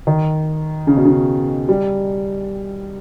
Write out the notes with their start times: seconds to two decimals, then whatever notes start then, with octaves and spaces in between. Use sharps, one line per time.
0.07 D#3
0.87 C#3
0.96 B2
1.05 C#3
1.69 G3